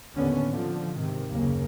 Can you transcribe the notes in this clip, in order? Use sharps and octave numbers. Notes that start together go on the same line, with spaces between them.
D#2 A2 D3 B3 C#4
D3 F3
G#2 C3 D#3
F#1 D#2 C#3 A#3